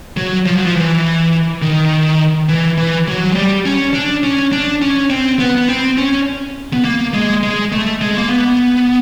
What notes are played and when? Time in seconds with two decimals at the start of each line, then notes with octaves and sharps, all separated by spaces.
0.17 F#3
0.46 F3
0.56 F#3
0.65 F3
0.75 E3
1.62 D#3
2.49 E3
2.78 E3
3.08 F#3
3.32 G#3
3.36 G3
3.66 C#4
3.94 D4
4.23 C#4
4.52 D4
4.82 C#4
5.10 C4
5.39 B3
5.57 B3
5.69 C4
5.98 C#4
6.73 B3
6.85 A#3
7.14 G#3
7.43 G#3
7.72 A3
8.01 G#3
8.18 A#3
8.29 B3